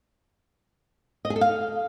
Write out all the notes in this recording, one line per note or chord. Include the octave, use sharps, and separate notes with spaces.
D#5
G#4
A4
F5